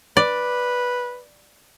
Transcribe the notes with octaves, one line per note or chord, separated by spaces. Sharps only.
B4 D5